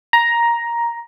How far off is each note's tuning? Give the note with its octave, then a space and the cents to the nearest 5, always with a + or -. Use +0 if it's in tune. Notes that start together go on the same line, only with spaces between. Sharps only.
A#5 +10